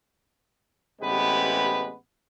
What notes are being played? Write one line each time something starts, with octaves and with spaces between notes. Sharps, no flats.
A1 C3 G#3 B3 G4 B4